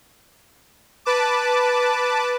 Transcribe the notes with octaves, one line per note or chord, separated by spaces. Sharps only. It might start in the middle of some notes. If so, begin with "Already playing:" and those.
B4 A5 D6